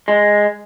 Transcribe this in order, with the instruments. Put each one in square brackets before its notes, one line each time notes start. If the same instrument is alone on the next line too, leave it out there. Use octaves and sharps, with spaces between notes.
[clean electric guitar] G#3